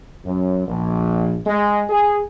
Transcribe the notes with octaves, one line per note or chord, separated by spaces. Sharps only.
F#2
A#1
G#3
G#4